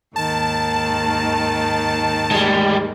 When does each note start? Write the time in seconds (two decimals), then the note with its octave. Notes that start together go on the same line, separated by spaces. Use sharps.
0.16 D#2 G#2 D#3 A5
2.32 G3 G#3